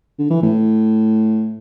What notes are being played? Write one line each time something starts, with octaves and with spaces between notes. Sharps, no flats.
D3
E3
A2